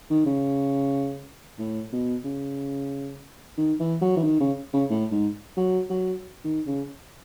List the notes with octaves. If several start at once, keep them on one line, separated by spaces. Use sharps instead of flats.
D#3
C#3
A2
B2
C#3
D#3
E3
F#3
E3
D#3
C#3
C#3
A2
G#2
F#3
F#3
D#3
C#3